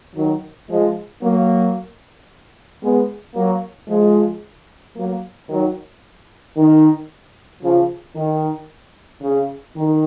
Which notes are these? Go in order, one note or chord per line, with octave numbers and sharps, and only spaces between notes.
D#3 F#3
F3 G#3
F#3 A#3
G#3 B3
F#3 A#3
F3 G#3
F#3 A#3
D#3 F#3
D#3
C#3 F3
D#3
C#3
D#3